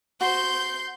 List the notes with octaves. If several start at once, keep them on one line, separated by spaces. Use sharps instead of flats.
F#4 C5 C6 G6